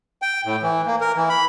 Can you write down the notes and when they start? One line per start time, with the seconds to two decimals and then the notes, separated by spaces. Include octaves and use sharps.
0.22 G5
0.45 A2
0.62 E3
0.86 A#3
1.01 A#4
1.16 E3
1.29 B5